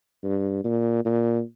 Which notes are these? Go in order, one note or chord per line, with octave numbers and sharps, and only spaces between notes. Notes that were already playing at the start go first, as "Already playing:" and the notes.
G2
A#2
A#2